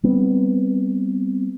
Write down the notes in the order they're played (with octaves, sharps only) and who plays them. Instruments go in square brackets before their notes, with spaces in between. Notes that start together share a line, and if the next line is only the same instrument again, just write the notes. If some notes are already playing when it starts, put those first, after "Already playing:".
[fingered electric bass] G3 B3 C4